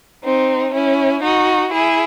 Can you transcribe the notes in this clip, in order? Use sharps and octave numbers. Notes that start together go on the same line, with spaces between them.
C4 D#4
C#4 E4
D#4 F#4
E4 G#4